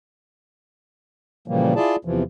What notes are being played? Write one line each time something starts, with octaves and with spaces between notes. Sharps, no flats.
A#2 C#3 E3 F3 G3 A#3
E4 F4 G#4 D5 A5
E2 C3 E3 F3